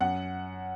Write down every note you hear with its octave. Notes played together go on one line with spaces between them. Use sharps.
F#2 F#5